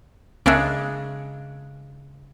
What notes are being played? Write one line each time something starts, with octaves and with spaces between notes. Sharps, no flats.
C#2 C#3 G#3 A#3 D4 E5